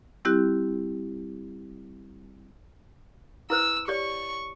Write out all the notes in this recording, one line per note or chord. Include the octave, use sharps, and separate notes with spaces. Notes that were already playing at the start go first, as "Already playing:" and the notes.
G3 C4 E4 G4 F#6
E4 B4 C5 E6
G4 C#5 D5 C#6